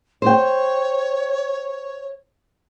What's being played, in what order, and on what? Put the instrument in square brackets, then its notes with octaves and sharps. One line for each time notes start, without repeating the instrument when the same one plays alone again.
[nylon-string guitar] C5 G5 [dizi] C#5